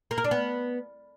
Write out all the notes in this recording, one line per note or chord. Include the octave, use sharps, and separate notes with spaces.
A#3
A#4
D4
B3